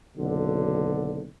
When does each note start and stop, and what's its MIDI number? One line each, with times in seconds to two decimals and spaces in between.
0.17 1.25 30
0.17 1.25 35
0.17 1.25 50